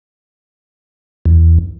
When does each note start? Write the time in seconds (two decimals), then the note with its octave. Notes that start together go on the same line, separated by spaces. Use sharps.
1.25 E2